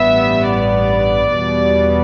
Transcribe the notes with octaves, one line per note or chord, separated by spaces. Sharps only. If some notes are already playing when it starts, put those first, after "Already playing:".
Already playing: A1 G2 G3 B3 E5
D5
E2 B2 G3 B3